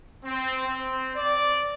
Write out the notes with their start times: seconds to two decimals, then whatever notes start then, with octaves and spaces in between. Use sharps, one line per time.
0.25 C4
0.66 C4
1.15 D5